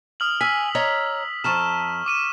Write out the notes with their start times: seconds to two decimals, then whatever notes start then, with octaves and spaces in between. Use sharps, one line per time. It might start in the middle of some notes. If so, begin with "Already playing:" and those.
0.20 D#6 F6 F#7
0.41 G#5 E6 F6 B6
0.75 C#5 D#5 A#5
1.44 F2 A5 A#5 C#6 F6 E7
2.06 D6 D#7 E7